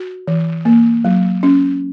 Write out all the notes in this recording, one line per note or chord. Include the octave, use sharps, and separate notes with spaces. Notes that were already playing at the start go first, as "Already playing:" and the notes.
Already playing: F#4
E3
A#3
F#3
C#4